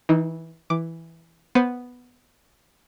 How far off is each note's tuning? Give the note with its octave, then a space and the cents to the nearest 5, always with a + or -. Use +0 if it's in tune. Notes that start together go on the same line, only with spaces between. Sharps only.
E3 -15 D#4 +15
E3 +0 D6 +0
B3 +0 C5 +0